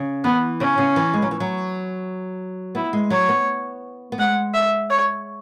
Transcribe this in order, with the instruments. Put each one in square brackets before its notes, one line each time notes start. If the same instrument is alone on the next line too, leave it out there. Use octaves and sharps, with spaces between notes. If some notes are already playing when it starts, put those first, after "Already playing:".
Already playing: [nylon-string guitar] C#3
[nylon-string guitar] E3 [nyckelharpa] B3
[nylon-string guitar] C#3 [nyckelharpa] C#4
[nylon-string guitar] C#3
E3
G#3
F#3
E3
F#3
[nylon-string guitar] B3 [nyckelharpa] E4
[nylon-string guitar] G#3
[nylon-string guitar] F#3 [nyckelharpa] C#5
[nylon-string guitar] B3
B3
[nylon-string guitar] G#3 [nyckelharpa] F#5
[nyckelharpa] E5
C#5